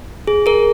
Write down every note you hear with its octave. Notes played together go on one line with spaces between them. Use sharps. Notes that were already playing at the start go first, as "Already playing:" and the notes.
G#4
G#4 A#4